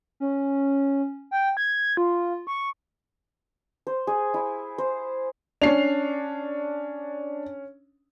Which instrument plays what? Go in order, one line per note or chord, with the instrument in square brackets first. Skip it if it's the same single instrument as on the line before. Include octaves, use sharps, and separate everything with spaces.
[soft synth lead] C#4
G5
G#6
F4
C#6
[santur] C5
G#4
E4
C5
[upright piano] C#4 C7 F7 [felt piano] D4